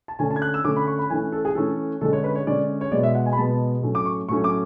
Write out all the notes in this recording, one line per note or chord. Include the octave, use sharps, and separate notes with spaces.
A5
D3 A3 C#4 G#5
A5
G#6
F#6
E6
D3 A3 C#4 D6
B5
C#6
B5
E3 A3 C#4 G#5
A4
G#4
E3 A3 C#4 A4
D3 G#3 C#4 A4
C#5
B4
C#5
D3 G#3 C#4 D5
C#5
B2 G#3 B3 D5
E5
F#5
G#5
B5
B2 G#3 B3 A5
A2 F#3 A3 C#4
D6
C#6
A2 F#3 A3 C#4 C#6
D6